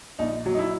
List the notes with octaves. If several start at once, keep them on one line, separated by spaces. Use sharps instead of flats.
A#1 D#4
F#3
D#4
E4